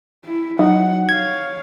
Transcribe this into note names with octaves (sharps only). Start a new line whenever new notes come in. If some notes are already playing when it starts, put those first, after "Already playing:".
E4
F#3 D#4 F#5
C#5 F5 G#6